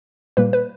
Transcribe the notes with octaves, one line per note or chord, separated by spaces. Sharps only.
A#2 G3 A#3 B4
B4